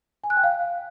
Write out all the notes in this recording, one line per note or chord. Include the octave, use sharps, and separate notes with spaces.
G#5
F#6
G5
F5